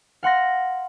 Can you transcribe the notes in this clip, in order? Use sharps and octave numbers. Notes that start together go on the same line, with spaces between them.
F5 F#5 C6 A#6